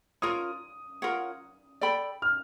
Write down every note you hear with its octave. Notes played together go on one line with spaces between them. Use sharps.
F4 A#4 C#5 D#6
F4 A#4 C#5 F#5
A4 D5 G5 B5
F6